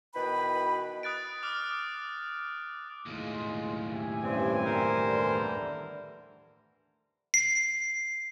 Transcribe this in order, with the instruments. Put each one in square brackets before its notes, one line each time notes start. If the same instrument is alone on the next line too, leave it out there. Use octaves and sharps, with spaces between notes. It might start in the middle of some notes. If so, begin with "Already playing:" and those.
[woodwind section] B2 D#3 E3 B4 G5 B5
[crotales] D#6 F#6 A6 D7
D6 D#6 F6
[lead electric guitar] D#2 A2 [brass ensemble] G#3 F4
[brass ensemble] G4 E5 G#5
[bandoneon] G2 C4 [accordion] C#3 E3 G3
[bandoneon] A#4 C5
[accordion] D3 E3 G3
[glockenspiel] C7